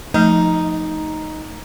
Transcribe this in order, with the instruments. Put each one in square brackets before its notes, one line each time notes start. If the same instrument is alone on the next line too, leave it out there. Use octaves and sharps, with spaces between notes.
[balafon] F3 A3 [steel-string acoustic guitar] D#4